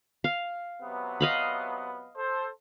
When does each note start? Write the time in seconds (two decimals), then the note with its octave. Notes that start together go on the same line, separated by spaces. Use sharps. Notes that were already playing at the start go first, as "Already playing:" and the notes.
0.24 F5
0.81 C3 F#3 B3
1.21 D#5 F5 B5
2.16 A4 C5